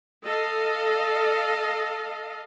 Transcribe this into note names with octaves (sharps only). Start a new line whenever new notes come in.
A4 D#5 F5